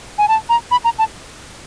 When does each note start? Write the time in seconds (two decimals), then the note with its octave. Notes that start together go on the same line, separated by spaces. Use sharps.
0.18 G#5
0.28 A5
0.49 A#5
0.71 B5
0.85 A#5
0.99 A5